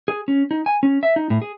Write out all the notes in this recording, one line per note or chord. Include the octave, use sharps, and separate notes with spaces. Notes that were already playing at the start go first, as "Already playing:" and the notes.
G#4
C#4
D#4
G#5
C#4
E5
D#4
A2
G#4